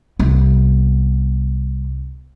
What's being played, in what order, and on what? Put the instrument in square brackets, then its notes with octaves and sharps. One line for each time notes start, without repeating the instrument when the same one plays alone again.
[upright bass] C2 B3